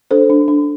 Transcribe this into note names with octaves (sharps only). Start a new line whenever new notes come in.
D4 A4 C5
D4
D4